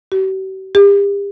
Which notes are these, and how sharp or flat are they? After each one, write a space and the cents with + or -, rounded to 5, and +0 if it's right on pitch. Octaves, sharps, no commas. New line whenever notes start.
G4 -45
G4 +40